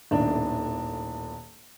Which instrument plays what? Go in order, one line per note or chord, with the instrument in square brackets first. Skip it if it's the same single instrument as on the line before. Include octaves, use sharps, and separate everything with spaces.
[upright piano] D#1 B1 A2 D#3 D4